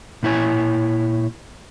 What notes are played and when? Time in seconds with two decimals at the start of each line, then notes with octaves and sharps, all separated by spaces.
0.23 A#2 E4 C#5 G#5